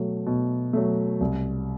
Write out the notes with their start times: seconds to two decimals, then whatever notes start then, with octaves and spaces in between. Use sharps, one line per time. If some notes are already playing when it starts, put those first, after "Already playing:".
Already playing: B2 F#3 A3
0.26 B2
0.73 F#3 A3
1.21 C2